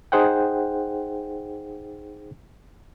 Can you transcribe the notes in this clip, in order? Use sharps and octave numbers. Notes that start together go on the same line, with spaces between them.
D#4 G#4 C5 F#5 G5